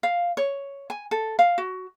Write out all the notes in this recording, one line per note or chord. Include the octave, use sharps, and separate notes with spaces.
F5
C#5
G#5
A4
F5
F#4